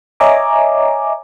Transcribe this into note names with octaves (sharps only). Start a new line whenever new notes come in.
C#5 D#5 E5 G#5 A#5 D6